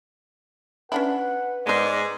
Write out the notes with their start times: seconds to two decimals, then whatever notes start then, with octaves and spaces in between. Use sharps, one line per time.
0.92 C#4 D4 E4 B4 F#5
1.67 G#2 G#3 B3 C5 D5